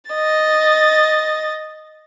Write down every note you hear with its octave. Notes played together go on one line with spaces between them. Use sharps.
D#5 A6